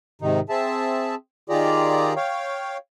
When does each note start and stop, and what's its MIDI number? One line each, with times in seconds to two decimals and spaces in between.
0.22 0.40 44
0.22 0.40 48
0.22 0.40 51
0.22 0.40 63
0.49 1.15 60
0.49 1.15 68
0.49 1.15 76
0.49 1.15 81
1.49 2.13 51
1.49 2.13 65
1.49 2.13 67
1.49 2.13 68
1.49 2.13 74
1.49 2.13 82
2.16 2.77 73
2.16 2.77 77
2.16 2.77 79